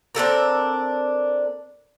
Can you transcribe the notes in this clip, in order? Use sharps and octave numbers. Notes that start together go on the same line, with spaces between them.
C4 D4 A4 A#4